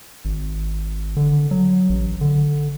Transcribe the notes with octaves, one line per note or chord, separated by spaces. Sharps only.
G#1
D3
F#3
A1
D3